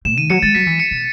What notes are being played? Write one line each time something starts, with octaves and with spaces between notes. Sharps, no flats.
A2 E7
D#3 D#7
F#3 C#7
G#3 A6
F#3 B6
E3
C#7
B2